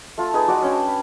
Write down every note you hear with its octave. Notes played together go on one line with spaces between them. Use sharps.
A3 F4
D#4 G#4 B4
G#3 F#4 D5
C#4 D4 G5
B5